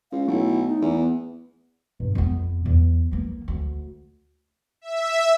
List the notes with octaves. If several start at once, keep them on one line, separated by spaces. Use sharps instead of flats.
C#2 F5
B1 A3 E4
D#4
E2
B3
G2
F2 B3
E2
E3 A#3
D2
E5